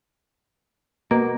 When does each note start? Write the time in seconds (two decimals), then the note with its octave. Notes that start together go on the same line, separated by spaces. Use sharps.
1.11 B2 A#3